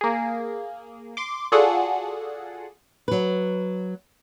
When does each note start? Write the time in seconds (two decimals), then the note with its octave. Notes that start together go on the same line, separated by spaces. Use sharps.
0.01 A#3 G#4
1.17 C6 D6
1.52 F4 F#4 G#4 A4 D5 F#5
3.08 F#3 B4